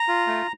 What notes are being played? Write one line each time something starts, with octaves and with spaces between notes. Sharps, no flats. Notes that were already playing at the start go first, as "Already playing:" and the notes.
Already playing: A#5
F4
A3